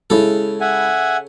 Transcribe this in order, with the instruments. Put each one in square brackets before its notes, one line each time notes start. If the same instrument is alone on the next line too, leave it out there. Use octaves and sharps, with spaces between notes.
[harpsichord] C#3 A4 [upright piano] G#3 E4
[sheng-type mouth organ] E5 F#5 G#5